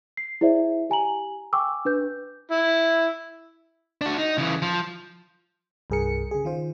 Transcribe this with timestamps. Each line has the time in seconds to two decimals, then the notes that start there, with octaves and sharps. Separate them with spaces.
0.17 C7
0.41 E4 G#4 C5 D5 E5
0.90 G4 G#5 A#5 F#7
1.53 G5 G#5 C#6 D6 E6
1.85 D4 B4 G6
2.51 E4
4.01 D4 F#4
4.18 D#4
4.38 C#3 E3
4.62 F3
5.90 C2 G2 G#4 A#4 C#7
6.31 C#3 G#4
6.45 D#3 F4 C5